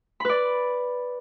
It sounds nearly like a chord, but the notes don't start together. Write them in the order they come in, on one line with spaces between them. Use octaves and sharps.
B5 B4 D5